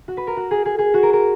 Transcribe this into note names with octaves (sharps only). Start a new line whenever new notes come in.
F#4
B4
A#4
F#4
G#4
G#4
G#4
F#4
A#4
A#4